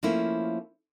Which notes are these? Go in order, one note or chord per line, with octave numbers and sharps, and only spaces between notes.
F3 A3 A#3 C#4 E4